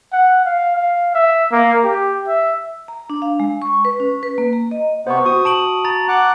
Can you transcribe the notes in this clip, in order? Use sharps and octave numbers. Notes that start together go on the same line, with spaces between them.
F#5
F5
F5
E5
A#3
G4
E5
A#5
D4
F5
G#3
C#6
B4
C#4
B4
A#3
A#5
D#5
C3 B3 C5 C#6
F#4 C#6 D#6
A5 D7 F#7
A#5 A6
F#5 D6 F#6